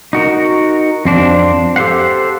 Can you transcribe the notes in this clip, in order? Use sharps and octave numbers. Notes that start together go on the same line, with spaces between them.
D#4 F#4 A#4
F2 C4 D4
G4 A4 C5 F5 F#5